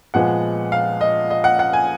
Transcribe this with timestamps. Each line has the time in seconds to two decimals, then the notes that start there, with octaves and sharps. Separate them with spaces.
0.14 A#2 F3 G#3 B3 F#5
0.72 F5
1.01 D#5
1.30 D#5
1.44 F#5
1.59 F#5
1.73 G#5